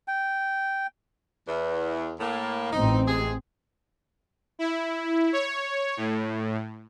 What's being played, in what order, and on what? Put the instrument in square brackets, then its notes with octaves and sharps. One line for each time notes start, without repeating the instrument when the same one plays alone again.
[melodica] G5
[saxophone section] E2
A2 A#3
[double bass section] A1 C4 [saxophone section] D#4
[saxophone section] C3 G#3 G#4
[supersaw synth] E4
C#5
A2